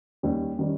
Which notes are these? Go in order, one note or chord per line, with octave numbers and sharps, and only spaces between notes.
D#2 D#3 G3 C#4
D#3 G3 C#4